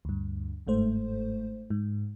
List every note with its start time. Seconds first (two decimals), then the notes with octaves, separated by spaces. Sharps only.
0.05 D2 G2
0.67 G1 G#2 A3 C5
1.70 G#2